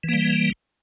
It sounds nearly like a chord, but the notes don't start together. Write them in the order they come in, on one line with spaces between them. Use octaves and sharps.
E3 A#3 G3